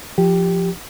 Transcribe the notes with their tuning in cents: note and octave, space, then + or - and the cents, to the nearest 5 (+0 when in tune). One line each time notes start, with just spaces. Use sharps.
F3 +0 G4 +0